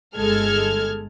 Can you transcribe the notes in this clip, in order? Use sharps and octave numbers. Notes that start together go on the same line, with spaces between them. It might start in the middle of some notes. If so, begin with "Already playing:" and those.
G1 G#3 A4 F6 G#6